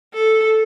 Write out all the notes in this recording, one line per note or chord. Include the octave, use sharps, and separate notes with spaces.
A4